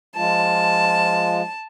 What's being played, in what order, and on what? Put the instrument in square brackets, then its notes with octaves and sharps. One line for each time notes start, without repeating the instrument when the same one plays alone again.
[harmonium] F3 G#3 F4 [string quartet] A5